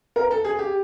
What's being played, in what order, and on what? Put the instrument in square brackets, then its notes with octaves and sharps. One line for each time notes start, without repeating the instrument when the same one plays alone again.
[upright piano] A#4
A4
G#4
G4